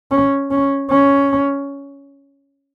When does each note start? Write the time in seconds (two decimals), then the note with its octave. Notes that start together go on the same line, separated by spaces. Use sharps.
0.11 C#4
0.51 C#4
0.90 C#4